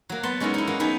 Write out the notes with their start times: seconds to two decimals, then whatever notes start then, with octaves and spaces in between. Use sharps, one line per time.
0.09 F#3 A#3
0.23 B3 A5 C6
0.40 G#3 C#4 D#4 E4 A#4
0.54 D#4 E4
0.67 F#3 A#3
0.80 B3 D#4 G#4